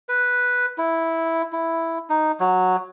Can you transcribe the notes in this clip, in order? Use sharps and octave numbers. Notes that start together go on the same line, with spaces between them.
B4
E4
E4
D#4
F#3